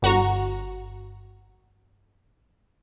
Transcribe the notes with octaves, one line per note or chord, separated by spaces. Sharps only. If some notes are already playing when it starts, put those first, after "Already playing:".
G1 F#4 A#5 C#6